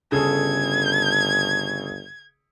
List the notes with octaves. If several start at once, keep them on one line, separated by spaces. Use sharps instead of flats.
G1 C#3 G#4 A4 G#6